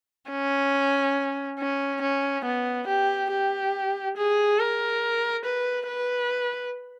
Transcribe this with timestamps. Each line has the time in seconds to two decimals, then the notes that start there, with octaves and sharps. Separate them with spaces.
0.30 C#4
1.59 C#4
2.03 C#4
2.45 B3
2.88 G4
3.31 G4
4.17 G#4
4.59 A#4
5.45 B4
5.88 B4